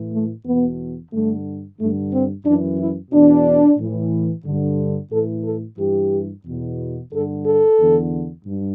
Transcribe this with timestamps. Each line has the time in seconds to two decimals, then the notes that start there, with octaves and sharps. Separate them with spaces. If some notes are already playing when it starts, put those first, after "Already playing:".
Already playing: A2 E3
0.12 A3
0.45 E2 B2 B3
1.11 G2 D3 A3
1.78 G2 D3 A3
2.12 C4
2.45 F#2 E3 D4
2.78 E4
3.11 E2 B2 D4
3.78 A2 E3
4.45 G2 D3
5.11 A2 E3 A4
5.44 A4
5.78 G2 E3 G4
6.44 E2 B2
7.12 G2 D3 A4
7.45 A4
7.78 E2 D3
8.45 G2